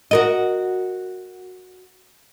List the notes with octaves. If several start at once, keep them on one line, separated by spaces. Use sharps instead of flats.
F#4 A#4 D#5